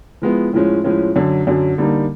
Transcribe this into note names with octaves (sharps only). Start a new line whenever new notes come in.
F3 G#3 B3 E4
A2 F3 G#3 C#4
A2 F3 G#3 C#4
F#2 D3 F#3
F#2 D3 F#3
D3 G3 A#3 D#4